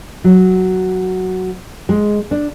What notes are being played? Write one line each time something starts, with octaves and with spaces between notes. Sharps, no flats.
F#3
G#3
D4